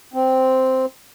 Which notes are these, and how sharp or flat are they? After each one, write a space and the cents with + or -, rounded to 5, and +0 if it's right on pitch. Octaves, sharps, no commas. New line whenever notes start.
C4 -5